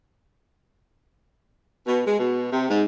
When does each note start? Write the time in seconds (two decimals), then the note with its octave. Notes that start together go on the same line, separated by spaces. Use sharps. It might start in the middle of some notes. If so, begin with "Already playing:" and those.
1.87 B2
2.06 G#3
2.19 B2
2.52 C3
2.69 G#2